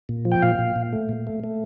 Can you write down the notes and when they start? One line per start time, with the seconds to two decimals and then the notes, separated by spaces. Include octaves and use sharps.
0.09 A#2
0.25 F3
0.32 G5
0.42 A#2 F5
0.59 A#2
0.76 A#2
0.93 A3
1.09 A#2
1.27 A3
1.44 A3